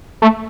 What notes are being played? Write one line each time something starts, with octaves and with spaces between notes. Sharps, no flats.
A3